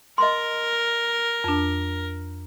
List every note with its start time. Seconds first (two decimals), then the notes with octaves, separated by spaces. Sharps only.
0.18 A#4 D#5 C6
1.44 F2 D4